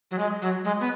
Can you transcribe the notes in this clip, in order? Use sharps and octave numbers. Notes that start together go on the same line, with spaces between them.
F#3
G#3
F#3
G#3
B3